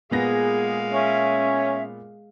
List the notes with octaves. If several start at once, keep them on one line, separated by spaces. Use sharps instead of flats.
A#2 G#3 B3 G#4 F5 A#6
C#4 E5